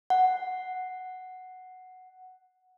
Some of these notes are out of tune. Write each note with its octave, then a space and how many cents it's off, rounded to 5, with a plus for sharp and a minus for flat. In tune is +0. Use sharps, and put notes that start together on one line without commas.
F#5 +0